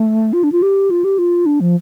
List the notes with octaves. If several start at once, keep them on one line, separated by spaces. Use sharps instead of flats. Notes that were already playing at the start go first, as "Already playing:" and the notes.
Already playing: A3
F4
D4
F4
G4
F4
G4
F4
D4
F3